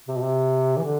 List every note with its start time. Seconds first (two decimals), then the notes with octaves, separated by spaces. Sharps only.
0.08 C3
0.17 B2
0.23 C3
0.77 E3
0.84 D3